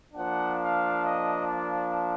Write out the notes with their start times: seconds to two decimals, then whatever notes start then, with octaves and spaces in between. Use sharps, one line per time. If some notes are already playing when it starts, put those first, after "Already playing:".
0.13 F3 A#3 D4 F#5
0.58 F5
1.03 D#5
1.46 D5